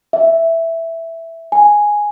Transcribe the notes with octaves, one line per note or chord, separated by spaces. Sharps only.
E5
G#5